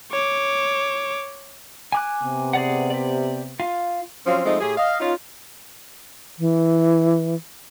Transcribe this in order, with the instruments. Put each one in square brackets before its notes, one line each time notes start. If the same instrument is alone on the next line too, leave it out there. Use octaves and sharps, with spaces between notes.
[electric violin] C#5 D6
[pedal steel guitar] G#5 D6 F#6
[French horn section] C3 B3
[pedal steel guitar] G#4 D5 F#5
G4 D5
F4 F5
[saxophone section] F3 F#3 C4 C#4 F5
F3 G#3 A3 C4 D#4
A2 G4 G#4
D#5 F5
C#4 D#4 F4
[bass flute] E3